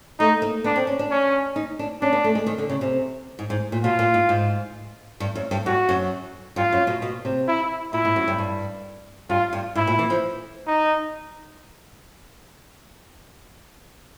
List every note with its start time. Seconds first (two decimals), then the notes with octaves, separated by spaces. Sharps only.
0.19 A3 D#4
0.42 A#3
0.64 B3 D4
0.76 C4
0.87 C#4
0.99 D4
1.11 C#4
1.56 D#4
1.79 D4
2.01 C#4 D4
2.13 B3
2.24 A3
2.35 G#3
2.46 D#3
2.58 D3
2.70 C#3
2.81 C3
3.39 G#2
3.50 G#2
3.72 A#2
3.83 B2 F4
3.99 A#2
4.14 G#2
4.29 G#2
5.20 G2
5.35 F#2
5.51 G2
5.65 G2 F#4
5.89 F#2
6.56 G2 F4
6.72 F#2
6.87 B2
7.02 B2
7.25 C3
7.48 E4
7.93 A#2 E4
8.05 G#2
8.16 F#2
8.28 G2
8.38 G2
9.30 G2 F4
9.53 G2
9.75 G#2 E4
9.87 A#2
9.99 E3
10.10 F3
10.67 D#4